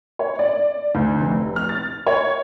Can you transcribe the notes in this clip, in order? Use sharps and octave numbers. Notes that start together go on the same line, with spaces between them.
C#5
D5
D2
F1
F6
A6
C#5